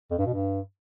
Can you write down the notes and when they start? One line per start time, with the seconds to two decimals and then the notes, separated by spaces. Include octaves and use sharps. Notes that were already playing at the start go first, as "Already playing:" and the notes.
0.11 F2
0.18 G2
0.26 B2
0.34 G2